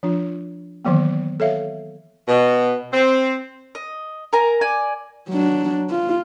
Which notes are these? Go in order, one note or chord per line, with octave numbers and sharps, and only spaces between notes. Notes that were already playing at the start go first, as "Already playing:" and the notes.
F3 D4 F4
D#3 E3 F#3 A#3 B3
A4 C#5 E5 F5
B2
C4
D#5
A#4 G#5 A#5
D5 G#5
F#3 D4
F4